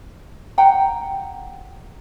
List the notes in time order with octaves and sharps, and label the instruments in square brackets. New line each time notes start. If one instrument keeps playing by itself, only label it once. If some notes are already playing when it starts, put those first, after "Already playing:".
[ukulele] F#5 G5 A#5